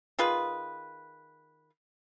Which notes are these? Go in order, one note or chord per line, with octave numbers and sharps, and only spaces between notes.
D#3 F4 G#4 B4